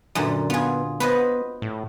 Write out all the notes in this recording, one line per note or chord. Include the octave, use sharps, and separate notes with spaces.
F#2 A#2 D3
B3 F4 G#4
B3 B4 C5 D#5
A2